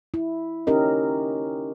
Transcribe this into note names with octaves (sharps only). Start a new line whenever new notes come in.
E4
C#4 D#4 G4 A#4 D#5